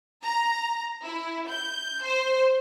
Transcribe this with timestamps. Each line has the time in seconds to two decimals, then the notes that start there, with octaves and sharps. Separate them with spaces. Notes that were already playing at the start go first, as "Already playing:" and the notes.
0.24 A#5
1.04 E4
1.49 G6
2.04 C5